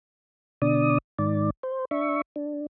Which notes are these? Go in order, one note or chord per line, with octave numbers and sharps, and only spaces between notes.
B2 D3 D4 D5 D#6
G#2 D#3 D5
C5
D4 E5 C#6
D4